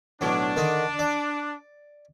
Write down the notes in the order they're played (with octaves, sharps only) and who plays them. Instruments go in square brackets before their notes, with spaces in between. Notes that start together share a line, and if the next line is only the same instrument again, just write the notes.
[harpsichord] B1 A2 F#3 [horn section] D4
[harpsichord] D3 D#3 D#4
D5